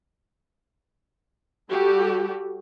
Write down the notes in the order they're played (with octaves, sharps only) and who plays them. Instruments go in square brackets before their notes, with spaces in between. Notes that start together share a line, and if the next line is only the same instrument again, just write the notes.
[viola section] G3 F#4 G4 A4